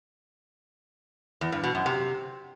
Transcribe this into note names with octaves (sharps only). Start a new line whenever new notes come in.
E2
G2
B2
F#2
C3